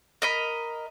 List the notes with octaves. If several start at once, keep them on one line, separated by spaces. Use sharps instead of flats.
A#4 D#5 B5